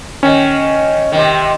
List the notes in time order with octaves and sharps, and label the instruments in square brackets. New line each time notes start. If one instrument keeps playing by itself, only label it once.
[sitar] D#3 [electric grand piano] C#4
[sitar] C3 D#3